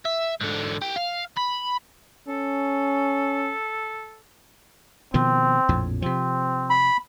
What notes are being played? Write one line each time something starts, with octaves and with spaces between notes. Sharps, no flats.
E5
G#2 D3
G4
F5
B5
C#4 A4
B2 D#3 F3 C4
A#1 F2 A2
C3 F3 C4
B5